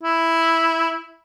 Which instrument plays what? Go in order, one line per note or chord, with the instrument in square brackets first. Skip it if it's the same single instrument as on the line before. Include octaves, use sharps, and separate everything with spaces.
[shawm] E4